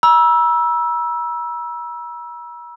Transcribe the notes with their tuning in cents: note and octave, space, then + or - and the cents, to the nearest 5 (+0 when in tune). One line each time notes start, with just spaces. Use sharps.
A#5 +45 E6 +0